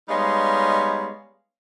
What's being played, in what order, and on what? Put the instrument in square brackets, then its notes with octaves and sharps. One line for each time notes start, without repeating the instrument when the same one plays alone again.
[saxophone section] G3 G#3 B3 D#4 C#5 F5